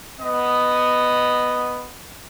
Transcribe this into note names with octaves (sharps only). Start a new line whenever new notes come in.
B3 D#5